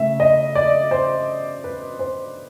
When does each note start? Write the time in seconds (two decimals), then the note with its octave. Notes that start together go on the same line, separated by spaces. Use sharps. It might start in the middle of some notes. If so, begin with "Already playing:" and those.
Already playing: C#3 A3 E5
0.20 D#5
0.55 D5
0.91 C5
1.64 B4
1.99 C5